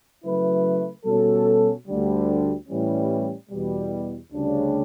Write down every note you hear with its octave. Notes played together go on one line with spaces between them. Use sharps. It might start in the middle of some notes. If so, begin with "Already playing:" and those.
C#3 F#3 A3 E4 B4
B2 G3 C#4 F#4 A4
D2 D3 G3
A2 E3 G3 C#4
E2 B2 G3
D2 C#3 G3 D4